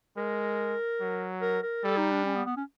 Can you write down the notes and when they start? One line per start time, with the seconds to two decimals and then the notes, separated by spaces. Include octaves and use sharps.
0.17 G#3 A#4
1.01 F#3
1.42 A#4
1.63 A#4
1.84 G3 A4
1.98 D#4
2.11 D4
2.25 C#4
2.36 B3
2.46 B3
2.57 C#4